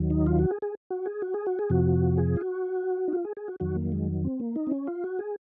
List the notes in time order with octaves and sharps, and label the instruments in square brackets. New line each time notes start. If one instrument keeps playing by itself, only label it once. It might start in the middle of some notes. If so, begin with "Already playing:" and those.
Already playing: [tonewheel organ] D#2 D#3 F#3
D#4
F4
F#4
G#4
G#4
F#4
G#4
F#4
G#4
F#4
G#4
F2 C3 F3 F#4
G#4
F4
F#4
D#4
F4
G#4
G#4
F#4
F2 D#3 F#3 F#4
A#3
G#3
C4
A#3
D#4
C4
C#4
F4
F#4
G#4